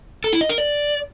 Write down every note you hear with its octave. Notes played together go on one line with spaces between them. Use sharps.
A4
E4
D#5
A#4
D5